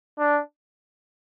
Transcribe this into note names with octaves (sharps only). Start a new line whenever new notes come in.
D4